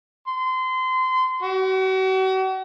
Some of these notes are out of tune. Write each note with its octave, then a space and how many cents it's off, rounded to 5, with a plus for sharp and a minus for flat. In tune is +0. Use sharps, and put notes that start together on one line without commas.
C6 -25
F#4 +40